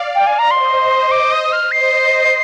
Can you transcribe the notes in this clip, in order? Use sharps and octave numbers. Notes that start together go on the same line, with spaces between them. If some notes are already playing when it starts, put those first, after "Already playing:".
Already playing: D5 F5
G5
G#5
A#5
C5 D#5 C6
C5 D#5 D6
D#6
D#6
F6
C5 D#5 C7